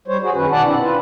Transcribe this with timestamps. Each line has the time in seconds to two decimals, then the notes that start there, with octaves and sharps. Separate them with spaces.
0.08 G3 C5 C#5
0.23 F#4 G#4
0.34 F#2 D#3 C#4 B4
0.52 B2 D#3 D5 F#5 A5
0.63 C4 D4 E4
0.81 F4 B4